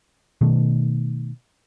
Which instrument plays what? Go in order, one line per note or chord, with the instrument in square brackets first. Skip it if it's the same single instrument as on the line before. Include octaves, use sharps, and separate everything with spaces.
[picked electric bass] B2 D#3 A3